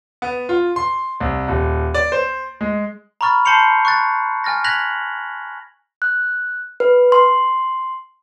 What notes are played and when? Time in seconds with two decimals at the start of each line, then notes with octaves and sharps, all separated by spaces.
0.22 B3
0.49 F4
0.76 C6
1.20 C2
1.48 D#1
1.94 D5
2.12 C5
2.61 G#3
3.21 A#5 B5 C#6 F6 A6
3.45 A5 C6 G6 C7 C#7 F7
3.85 C#6 F#6 A6
4.44 G#5 F6 A6 A#6
4.64 F#6 G#6 A#6 B6 F7 F#7
6.02 F#6
6.80 B4
7.12 C6